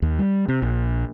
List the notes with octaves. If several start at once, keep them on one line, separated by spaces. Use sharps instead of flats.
D#2
G3
C3
A#1